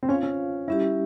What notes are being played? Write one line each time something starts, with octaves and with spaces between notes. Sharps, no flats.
C4
C#4 F4 C5 F5
C#4
G3 C#4 E4 G4